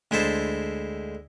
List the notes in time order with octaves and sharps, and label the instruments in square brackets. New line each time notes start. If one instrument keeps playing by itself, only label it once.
[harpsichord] D2 G#3 E4 C5 A5